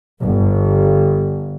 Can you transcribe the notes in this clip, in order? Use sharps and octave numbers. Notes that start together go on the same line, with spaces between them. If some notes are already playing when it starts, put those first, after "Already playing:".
G1